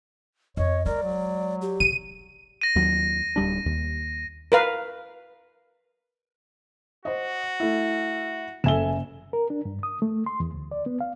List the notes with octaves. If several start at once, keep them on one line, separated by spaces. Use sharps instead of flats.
F2 C#5 D#5
G#3 A#4 D5
F#3
G4
C#3 D#7
A#6 D#7
D#2 F#3
D1 G3 D4
D#2
A#4 B4 F5
F#4 C5 D#5
A3 E4
F#1 A4 E5 G#5 E7 G7
A#4
D4
G2
D#6
A3
C6
E2
D2
D5
B3
F5